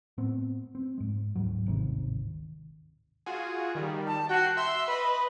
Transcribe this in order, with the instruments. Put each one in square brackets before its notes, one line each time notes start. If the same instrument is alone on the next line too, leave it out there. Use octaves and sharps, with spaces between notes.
[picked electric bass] A2 B3 C4
C4
G#2 G#3
D1 G#2 F#3
D1 G#1 C3 D#3
[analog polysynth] F4 F#4 G#4
D#3 G3
[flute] A5
[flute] F#4 [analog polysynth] G5 C7
[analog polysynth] E5 E6 [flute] C6
[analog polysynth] B4 D#5 [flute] B5